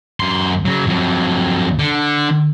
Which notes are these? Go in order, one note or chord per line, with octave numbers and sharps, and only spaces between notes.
F#2 C6
C#3 F#3
F2 F#3
D3